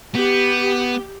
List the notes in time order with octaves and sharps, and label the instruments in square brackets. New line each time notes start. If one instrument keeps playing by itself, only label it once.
[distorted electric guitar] B3 [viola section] G4